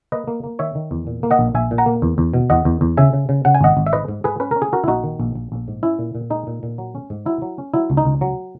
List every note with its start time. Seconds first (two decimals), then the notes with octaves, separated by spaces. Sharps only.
0.12 A#3 B4 D#5
0.28 A#3
0.44 A#3
0.59 D#3 C#5 E5
0.75 D#3
0.91 E2
1.07 A#2
1.23 A#3
1.31 D#5 F#5
1.39 A#1
1.55 A#1 E5 G#5
1.71 A#2
1.78 F#5 A#5
1.86 A#3
2.02 E2
2.18 E2
2.34 B2
2.50 E2 D#5 F#5
2.65 E2
2.81 E2
2.97 C#3 E5 G#5
3.13 C#3
3.29 C#3
3.45 C#3 F#5
3.54 G#5
3.61 G#1 D#5 F#5
3.77 G#1
3.86 E5
3.93 G#2 B4 D#5
4.08 G#2
4.24 G#2 G#4 B4
4.40 C#4 B4
4.51 C#4 A#4
4.62 G#4
4.72 C#4 F#4 A#4
4.84 E4
4.88 A#1 D#4 F#4
5.04 D#3
5.20 A#1
5.35 A#1
5.52 A#1
5.68 G#2
5.83 C#4 E4
5.99 A#2
6.15 A#2
6.30 G#3 D#4
6.47 A#2
6.63 A#2
6.78 F#3
6.95 C#4
7.10 G#2
7.26 F#3 E4
7.42 F#3
7.58 C#4
7.74 F#3 E4
7.90 C#2
7.97 D#4
8.05 C#2
8.21 F#3